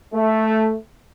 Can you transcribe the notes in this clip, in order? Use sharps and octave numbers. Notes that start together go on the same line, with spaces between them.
A3